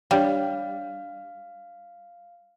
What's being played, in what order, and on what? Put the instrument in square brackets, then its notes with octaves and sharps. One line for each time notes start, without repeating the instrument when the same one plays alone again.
[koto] G3 [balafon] D4 G4 C#5 [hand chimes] F5